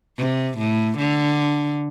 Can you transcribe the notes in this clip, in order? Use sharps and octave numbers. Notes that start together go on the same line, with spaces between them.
C3
A2
D3